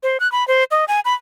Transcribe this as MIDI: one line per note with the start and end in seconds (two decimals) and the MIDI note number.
0.03 0.17 72
0.20 0.30 90
0.32 0.46 83
0.48 0.64 72
0.71 0.85 75
0.88 1.00 80
1.05 1.14 83